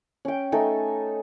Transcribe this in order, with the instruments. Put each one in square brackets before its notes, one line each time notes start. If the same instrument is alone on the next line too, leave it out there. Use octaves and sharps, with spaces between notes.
[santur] C#4 G5
A3 D#4 A4 G#5